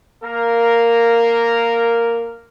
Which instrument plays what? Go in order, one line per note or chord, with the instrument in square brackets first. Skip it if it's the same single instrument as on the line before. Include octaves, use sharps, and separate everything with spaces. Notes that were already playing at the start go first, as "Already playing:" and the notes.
[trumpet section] A#3 A#4